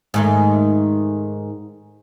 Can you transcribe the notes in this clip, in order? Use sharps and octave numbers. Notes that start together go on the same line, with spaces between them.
G#2 D#3 A3